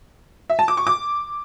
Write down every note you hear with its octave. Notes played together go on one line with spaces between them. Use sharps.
E5
A5
D6
C#6
D6